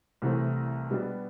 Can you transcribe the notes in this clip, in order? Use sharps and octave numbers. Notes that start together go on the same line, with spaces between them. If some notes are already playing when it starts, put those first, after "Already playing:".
C2 C3 E3 A3 C4
B2 G3 B3 D4 G4